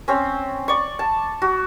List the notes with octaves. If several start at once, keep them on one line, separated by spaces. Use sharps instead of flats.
C4 C#4
D5 C#6
A5
F#4